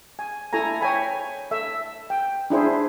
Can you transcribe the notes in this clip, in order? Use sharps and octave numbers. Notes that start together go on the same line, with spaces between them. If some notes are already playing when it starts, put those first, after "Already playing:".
G#5
E4 A4 G#5 A#5
C#5 G5 G#5 B5
A4 E5
G5
D4 E4 G#4 C5